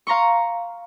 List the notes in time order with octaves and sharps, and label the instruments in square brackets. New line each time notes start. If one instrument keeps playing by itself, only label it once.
[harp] F5 A#5 C6 C#6